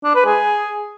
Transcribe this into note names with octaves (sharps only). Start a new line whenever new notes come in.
D4
B4
G#4